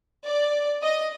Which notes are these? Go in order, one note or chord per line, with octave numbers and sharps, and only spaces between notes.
D5
D#5